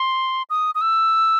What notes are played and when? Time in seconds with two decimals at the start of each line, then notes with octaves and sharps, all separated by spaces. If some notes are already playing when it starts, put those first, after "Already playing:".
Already playing: C6
0.50 D#6
0.75 D#6
0.81 E6